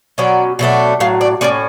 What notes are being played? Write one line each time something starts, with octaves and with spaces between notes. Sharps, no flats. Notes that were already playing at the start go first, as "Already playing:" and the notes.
B2 F#3 C#4 D5
B2 F#3 A3 D4
A2 F#3 F5
D5
A2 G#3 C#4 D5